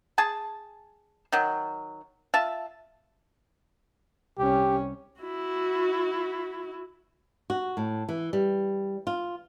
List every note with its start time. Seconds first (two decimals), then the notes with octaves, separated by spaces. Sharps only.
0.18 G#4 G#5 A5
1.32 D#3 F#3
2.34 F4 E5 A5
4.38 C2 C#4 G4
5.21 E4 F#4
7.50 F#4
7.77 A2
8.09 E3
8.33 G3
9.07 F4